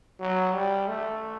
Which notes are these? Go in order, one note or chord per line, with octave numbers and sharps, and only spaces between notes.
F#3
G3
A3